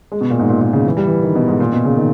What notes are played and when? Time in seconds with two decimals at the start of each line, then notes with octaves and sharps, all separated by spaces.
0.12 G#3
0.21 B2
0.30 A#2
0.39 G#2
0.49 A#2
0.61 A#2
0.73 C#3
0.86 E3
0.97 G3
1.07 E3
1.23 D#3
1.35 B2
1.48 G#2
1.60 A#2
1.72 B2
1.85 C#3
1.97 D#3